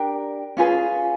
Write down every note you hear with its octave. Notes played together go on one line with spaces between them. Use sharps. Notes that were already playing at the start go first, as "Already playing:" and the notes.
Already playing: D4 G4 A#4 G5
C#4 F4 G#4 B4